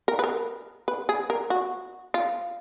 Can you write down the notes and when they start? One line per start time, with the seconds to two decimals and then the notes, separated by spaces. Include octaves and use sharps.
0.08 A#4
0.19 B4
0.24 A#4
0.88 B4
1.09 G#4
1.30 A#4
1.50 F#4
2.14 F4